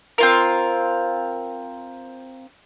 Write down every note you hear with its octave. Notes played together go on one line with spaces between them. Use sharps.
C4 F4 A#4